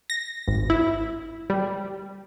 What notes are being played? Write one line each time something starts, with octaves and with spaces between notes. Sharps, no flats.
A#6
G#1
E4
G3